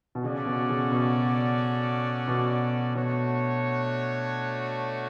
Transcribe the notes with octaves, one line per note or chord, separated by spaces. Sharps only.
B2
C#3 C#4 F#4 A4 D5
B2
C#3
B2
B2
B2 A3 D4 F#4 C#5